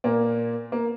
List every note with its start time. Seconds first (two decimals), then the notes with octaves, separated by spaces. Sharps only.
0.04 A#2 A#3
0.72 A#3